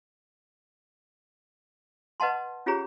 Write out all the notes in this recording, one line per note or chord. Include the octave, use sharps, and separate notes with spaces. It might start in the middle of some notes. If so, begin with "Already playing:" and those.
B4 D#5 F#5 A5 C6
C#4 F4 G4 G#4 C#5 A#5